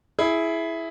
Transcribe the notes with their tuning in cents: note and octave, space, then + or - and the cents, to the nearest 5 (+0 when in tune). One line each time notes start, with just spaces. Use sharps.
E4 +0 G#4 +15